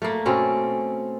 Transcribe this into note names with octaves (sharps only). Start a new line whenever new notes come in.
A3 A#3
B2 C4 C#4